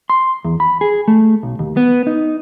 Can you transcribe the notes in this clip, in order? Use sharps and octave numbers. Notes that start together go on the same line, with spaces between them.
C6
E2
B5
G#4
A3
B1
D#2
B3
D#4